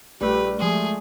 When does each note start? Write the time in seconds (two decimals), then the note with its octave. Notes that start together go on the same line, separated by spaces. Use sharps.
0.21 A#1 G3 A3 G4 B4
0.59 F3 G#3 A3 G#4